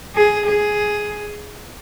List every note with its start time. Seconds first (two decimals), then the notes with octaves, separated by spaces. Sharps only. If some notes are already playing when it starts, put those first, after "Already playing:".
0.15 G#4
0.47 G#4